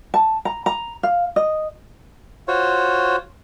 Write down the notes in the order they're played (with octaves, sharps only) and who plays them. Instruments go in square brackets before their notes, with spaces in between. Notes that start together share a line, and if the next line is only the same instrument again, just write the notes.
[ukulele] A5
A#5
A#5
F5
D#5
[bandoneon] F4 F#4 C5 C#5